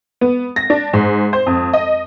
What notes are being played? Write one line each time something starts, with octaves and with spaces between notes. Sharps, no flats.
B3
A#6
D4
G#2
C5
F2
D#5